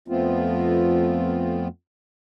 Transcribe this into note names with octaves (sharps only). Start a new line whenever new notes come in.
F2 F3 A3 B3 C4 F4